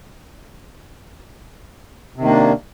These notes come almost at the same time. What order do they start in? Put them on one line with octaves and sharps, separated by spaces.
C3 D#3 A#3 D4